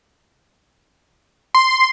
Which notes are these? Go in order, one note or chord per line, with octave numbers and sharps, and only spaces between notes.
C6